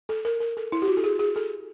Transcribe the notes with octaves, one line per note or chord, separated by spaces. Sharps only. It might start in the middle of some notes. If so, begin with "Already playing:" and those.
A4
A#4
A#4
A4
E4
G4
F#4
A4
G#4
G#4
A4